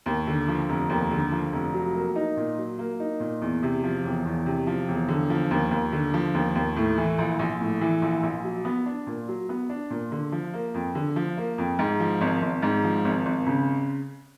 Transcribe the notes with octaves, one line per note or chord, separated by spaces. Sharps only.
D#2
D3
F3
F1
D#2
D3
F3
F1
F#3
A#3
D#4
A#2
F#3
A#3
D#4
A#2
E2
C3
F3
E1
E2
C3
F3
E1
D3
F3
D#2
D#2
D3
F3
D#2
D#2
A2
E3
A#1
A#1
A2
E3
A#1
A#1
F#3
B3
D4
A#2
F#3
B3
D4
A#2
D3
F3
A#3
F2
D3
F3
A#3
F2
G#2
F3
G#1
G#1
G#2
F3
G#1
G#1
C#3